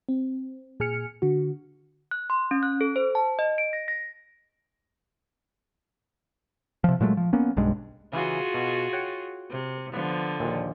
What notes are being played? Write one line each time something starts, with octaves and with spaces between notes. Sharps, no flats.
C4
A#2 G#4 G#5 F6 C#7
D3 F#4
F#6
C6
C#4
F#6
A4
C5
A5
D#5
D7
A#6
A#6
C3 F3
A#2 F#3 G#3 A3
F3
A#3 B3 C#4
B1 G2 G#3
C#3 E3 F4 F#4 G#4
B2
C#5 F#5 G5
C3
D3 F3 B3
A#1 D#2 A#2